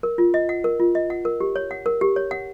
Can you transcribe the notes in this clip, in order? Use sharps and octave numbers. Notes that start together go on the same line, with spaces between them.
A#4
F4
D#5
F#5
A#4
F4
D#5
F#5
A#4
G4
C#5
F#5
A#4
G4
C#5
F#5